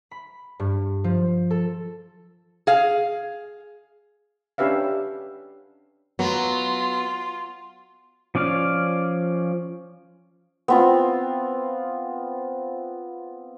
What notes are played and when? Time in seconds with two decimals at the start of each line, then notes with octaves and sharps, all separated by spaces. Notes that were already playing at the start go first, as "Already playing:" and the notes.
0.11 B5
0.60 G2
1.04 F3
1.50 A4
2.67 G#4 F5
4.58 C#4 D4 G4 B4 E5 F5
6.19 F#3 B3 F4
8.35 F3 C#4 D5 F5 F6
10.68 B3 C4 F4